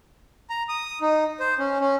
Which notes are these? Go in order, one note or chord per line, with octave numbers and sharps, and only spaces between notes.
A#5
D#6
D#4
C5
C#4
C#4